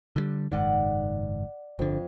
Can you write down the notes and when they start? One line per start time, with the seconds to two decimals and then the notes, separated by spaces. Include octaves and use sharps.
0.16 D3 D#3 G3
0.52 F#1 G#2 D#3 D5 F#5
1.79 G1 F2 D3